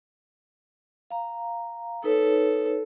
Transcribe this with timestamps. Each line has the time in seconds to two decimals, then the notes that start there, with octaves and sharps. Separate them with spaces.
1.10 F5 A#5
2.04 D#4 A4 B4 C#5